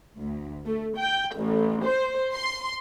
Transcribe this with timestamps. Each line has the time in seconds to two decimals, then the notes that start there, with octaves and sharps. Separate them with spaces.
0.20 D2
0.66 A3
0.97 G5
1.36 A1
1.83 C5
2.33 C6